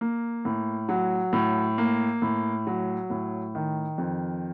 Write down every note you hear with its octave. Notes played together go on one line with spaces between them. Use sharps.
A#3
A2
F#3
A2
A#3
A2
F#3
A2
D#3
F2